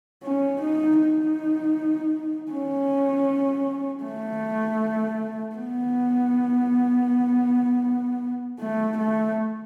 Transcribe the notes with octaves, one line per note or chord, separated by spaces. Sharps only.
C#4
D#4
D#4
C#4
A3
B3
A3
A3